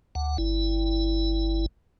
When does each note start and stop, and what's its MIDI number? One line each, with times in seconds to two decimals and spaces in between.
0.15 0.37 38
0.15 0.37 78
0.38 1.66 31
0.38 1.66 64